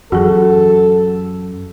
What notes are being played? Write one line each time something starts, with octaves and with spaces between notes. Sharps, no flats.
F#2 E3 F#4 G#4 A4